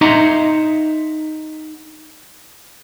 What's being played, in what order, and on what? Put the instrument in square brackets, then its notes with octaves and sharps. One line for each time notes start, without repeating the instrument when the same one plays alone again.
[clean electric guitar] D#4 D#5 E5 F#5 A#5 C6